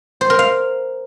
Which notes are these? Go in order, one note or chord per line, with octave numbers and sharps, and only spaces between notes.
C5
A#4
F5